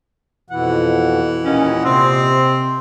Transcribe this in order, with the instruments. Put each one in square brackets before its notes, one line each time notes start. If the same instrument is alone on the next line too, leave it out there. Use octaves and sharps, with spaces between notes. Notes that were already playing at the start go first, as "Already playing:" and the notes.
[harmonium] F2 B2 [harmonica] E3 F#5
[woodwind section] D#2 C#4 [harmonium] A#2 D#5
[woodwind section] C3 [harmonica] C4 C6